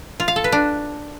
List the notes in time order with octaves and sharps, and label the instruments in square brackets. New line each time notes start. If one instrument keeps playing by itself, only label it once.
[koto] F4
F5
A4
B4
D4